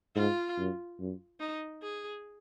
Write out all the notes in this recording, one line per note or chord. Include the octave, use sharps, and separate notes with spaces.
G#2 F4
F#2
F#2
D#4
G#4